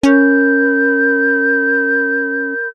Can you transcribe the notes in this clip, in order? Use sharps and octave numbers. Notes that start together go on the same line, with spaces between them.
C#4 A#4 B5 G6